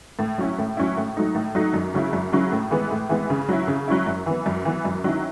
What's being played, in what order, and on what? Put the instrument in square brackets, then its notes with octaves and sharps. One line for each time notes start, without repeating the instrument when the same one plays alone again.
[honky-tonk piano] A2
F#3 C#4 E4
A2
F#3 C#4 E4
A2
F#3 A3 D#4
A2
F#3 A3 D#4
F#2
C#3 F#3 C#4 E4
F#2
C#3 F#3 C#4 E4
A2
E3 G#3 B3
A2
E3 G#3 B3
C#3
F#3 C#4 E4
C#3
F#3 C#4 E4
F#2
E3 B3
F#2
E3 B3
F#2
D#3 F#3 C#4 E4